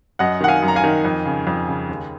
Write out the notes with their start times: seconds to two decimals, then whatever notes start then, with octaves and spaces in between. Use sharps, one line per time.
0.19 F#2 D#5 F#5
0.41 D#3 F#5
0.48 F5 G#5
0.62 F#2
0.68 A#5
0.76 F5 G#5
0.84 D#3
1.04 F2
1.25 C#3
1.47 F2
1.68 C#3
1.89 D#2